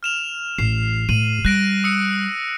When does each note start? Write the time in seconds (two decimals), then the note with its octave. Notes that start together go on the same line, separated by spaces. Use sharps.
0.03 F6 E7 F7
0.58 A1 C7
1.09 A2 D#7 F#7
1.45 G3 F#6 A#6 D7
1.84 D#6 E6 C#7